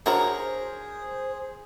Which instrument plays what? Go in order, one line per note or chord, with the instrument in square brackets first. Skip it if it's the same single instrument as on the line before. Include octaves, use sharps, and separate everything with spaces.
[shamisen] D4 F#4 A#5 [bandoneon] G#4 [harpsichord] A#4 C#5 [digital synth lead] C5